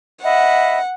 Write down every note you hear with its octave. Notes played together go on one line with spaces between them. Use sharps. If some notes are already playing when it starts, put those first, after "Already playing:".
D#5 E5 F#5 B5